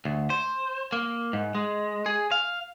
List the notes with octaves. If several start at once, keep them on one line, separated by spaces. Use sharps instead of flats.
D2
C5
A#3
G#2
G#3
G#4
F5